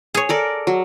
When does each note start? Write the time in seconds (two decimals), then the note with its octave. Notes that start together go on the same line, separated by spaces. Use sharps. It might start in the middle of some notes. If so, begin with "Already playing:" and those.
0.14 G#4 C#5
0.29 A4 A#4 D5
0.67 F#3